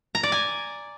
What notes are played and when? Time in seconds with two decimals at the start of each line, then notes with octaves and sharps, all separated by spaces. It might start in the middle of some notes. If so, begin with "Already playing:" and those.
0.15 A#5
0.23 D5
0.32 G#5